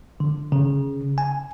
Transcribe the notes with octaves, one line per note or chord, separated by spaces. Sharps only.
D3
C#3
G#5